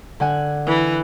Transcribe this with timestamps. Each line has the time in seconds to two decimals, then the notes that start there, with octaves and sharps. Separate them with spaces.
0.20 D3 F#5 G#5
0.67 E3